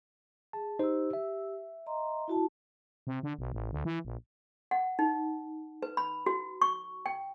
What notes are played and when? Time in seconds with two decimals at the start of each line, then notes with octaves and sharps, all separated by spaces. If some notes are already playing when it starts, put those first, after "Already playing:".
0.53 G#4 A5
0.79 D#4 G4 C5 E6
1.13 E5
1.86 D#5 A#5 C6
2.28 E4 F#4 A5
3.07 C3
3.23 D3
3.39 B1
3.53 A1
3.72 D2
3.85 E3
4.05 A#1
4.71 F#5
4.99 D#4
5.82 B4
5.97 B5
6.26 F#4
6.61 C#6
7.06 G5